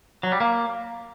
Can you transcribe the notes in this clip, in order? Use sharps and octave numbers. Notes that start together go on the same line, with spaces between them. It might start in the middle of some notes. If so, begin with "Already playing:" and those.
F#3
G3
A#3